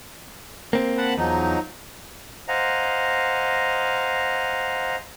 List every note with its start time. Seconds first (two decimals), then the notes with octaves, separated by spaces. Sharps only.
0.73 A#3 C4
0.98 F#5 A5 B5
1.18 E2 F3 F#3 D#4
2.48 C5 D#5 F5 F#5 G#5 A#5